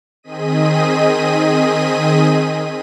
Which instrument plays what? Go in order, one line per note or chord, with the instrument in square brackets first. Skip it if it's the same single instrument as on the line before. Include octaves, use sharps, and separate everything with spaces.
[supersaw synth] D#3 C4 G#4 D#5 B6 D#7